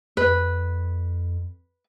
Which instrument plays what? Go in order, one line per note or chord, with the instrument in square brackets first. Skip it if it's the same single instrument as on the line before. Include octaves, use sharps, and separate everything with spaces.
[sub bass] F2 [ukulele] B4